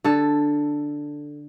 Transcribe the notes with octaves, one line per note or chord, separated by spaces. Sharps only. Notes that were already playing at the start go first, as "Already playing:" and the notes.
D3 A4